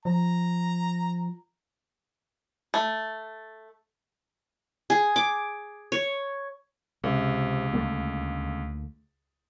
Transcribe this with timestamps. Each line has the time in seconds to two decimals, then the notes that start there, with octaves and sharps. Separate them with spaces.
0.05 F3 A#5
2.74 A3
4.90 G#4
5.16 D6
5.92 C#5
7.04 C#2 C3
7.73 D2 A3 A#3